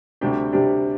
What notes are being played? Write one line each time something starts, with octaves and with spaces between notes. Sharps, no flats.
D2 C3 G3 D4 G4
D2 C3 G3 D4 G4